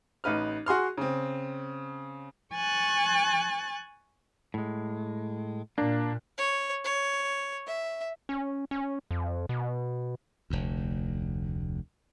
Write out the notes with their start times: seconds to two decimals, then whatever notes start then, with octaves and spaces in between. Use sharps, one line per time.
0.24 A1 D#4 B4 F6
0.66 F#4 G#4 C6 F6
0.98 C#3 C4
2.54 G#5 C#6 F#6 A6
4.54 A2 G#3
5.78 A#2 A#3 D4
6.38 C#5
6.84 C#5
7.67 E5
8.29 C#4
8.71 C#4
9.11 F2
9.49 B2
10.50 F1 D2